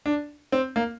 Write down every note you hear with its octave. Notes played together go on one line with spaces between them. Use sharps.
D4
C4
A#3